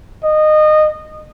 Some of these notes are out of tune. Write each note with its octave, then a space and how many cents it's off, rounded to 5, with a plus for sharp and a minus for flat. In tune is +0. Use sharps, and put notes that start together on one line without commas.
D#5 -20